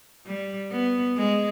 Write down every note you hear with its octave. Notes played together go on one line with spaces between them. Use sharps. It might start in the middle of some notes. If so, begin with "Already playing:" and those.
G3
B3
G#3